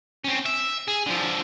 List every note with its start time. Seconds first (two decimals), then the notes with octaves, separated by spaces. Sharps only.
0.24 C4 C#4
0.46 E5
0.88 G#4
1.07 D3 F3